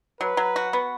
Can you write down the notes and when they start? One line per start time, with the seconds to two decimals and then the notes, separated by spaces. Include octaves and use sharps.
0.21 F#3 B4
0.37 F#3
0.56 F#4
0.73 B3